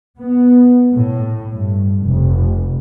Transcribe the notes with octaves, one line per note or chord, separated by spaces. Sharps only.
B3
A2
G2
F1